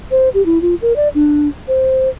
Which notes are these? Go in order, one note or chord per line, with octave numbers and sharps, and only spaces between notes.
C5
G4
E4
F4
A#4
D5
D4
C5